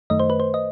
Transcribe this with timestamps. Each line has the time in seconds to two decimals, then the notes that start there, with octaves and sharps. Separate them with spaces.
0.10 F#2 D#3 A3 D#5
0.20 C5
0.30 B4
0.40 C5
0.54 D#5